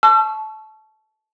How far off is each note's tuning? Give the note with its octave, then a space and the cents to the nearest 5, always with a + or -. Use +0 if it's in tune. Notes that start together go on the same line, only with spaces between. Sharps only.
A5 -20 C#6 +0 E6 +40